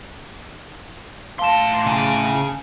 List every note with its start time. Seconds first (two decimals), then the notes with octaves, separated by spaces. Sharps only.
1.39 A2 F5 A5 C6 E7
1.86 C#3 G#5